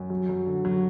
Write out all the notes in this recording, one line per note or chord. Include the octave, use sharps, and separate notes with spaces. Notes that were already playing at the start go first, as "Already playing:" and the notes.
Already playing: F#2
F#3
F#3
D3
F#3